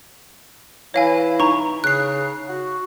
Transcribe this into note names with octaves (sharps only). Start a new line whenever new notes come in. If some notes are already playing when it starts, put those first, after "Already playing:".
E3 E4 C#5 F5 G#5 A#6
D#4 A#5 C#6
C#3 F#6 C7
F#4